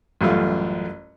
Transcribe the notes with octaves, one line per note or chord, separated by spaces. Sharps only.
A1 F#2 G3 A3 F4